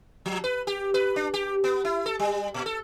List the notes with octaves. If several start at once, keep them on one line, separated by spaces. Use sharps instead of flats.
F3
B4
G4
B4
D4
G4
B3
E4
A4
G3
A#2
A4